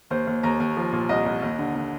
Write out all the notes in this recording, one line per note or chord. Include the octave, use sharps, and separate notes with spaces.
D#2 C5
D#2
D#2 A#5
D#2
F3
A#2
C2 D#5
C2
D#2
D3
D3